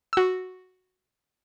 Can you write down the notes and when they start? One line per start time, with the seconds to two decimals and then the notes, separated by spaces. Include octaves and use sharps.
0.13 F#4 E6